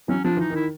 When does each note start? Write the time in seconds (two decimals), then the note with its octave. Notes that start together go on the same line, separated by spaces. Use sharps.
0.08 E3 F#3 C#4
0.24 F3 D4
0.37 E3 D#4
0.50 D#3
0.56 E4